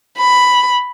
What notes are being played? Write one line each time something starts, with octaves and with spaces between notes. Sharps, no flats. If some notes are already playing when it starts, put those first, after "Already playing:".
B5